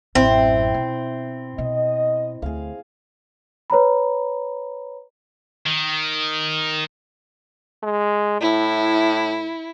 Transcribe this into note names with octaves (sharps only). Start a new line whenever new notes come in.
A1 F#2 C4 E4
B2
B2 D#5
D2 G#4 F5
B4 C#5 A#5 B5
D#3
G#3
A2 E4